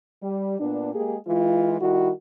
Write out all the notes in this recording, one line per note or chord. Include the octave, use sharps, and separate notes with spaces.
G3
A#2 B3 D4
G#3 A#3 G4 G#4
E3 G#3 F4
D#3 G3 E4 F#4